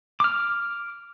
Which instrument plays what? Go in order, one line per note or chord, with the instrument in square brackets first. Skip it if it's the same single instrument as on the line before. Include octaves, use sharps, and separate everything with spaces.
[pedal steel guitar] D6 F6